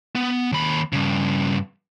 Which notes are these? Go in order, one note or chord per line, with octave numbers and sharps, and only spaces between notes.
B3
D#2 B5
G2 C#3